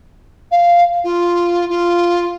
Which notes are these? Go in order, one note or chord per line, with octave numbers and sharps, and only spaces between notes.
F5
F4
F4